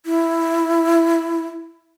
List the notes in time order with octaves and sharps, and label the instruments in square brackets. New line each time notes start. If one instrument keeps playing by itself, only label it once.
[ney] E4